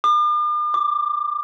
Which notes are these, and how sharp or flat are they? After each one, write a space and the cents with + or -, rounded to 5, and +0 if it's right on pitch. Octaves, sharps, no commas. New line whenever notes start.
D6 +45
D6 +5